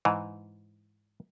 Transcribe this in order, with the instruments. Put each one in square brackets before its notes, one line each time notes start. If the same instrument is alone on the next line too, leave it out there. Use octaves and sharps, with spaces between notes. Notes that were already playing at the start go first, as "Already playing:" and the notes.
[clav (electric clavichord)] G#2 E3